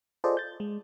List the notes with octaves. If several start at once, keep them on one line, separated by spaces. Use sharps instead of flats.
F4 G#4 A4 C5 D5 D#5
G6 A6
G#3